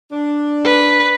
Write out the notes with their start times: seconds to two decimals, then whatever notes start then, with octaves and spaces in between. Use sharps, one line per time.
0.12 D4
0.65 B4